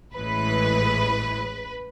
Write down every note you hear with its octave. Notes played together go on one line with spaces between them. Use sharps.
A1 A2 E3 G#3 B4